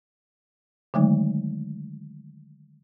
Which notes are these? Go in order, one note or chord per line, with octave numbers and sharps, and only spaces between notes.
D3 D#3 F#3 G#3 A3 D#4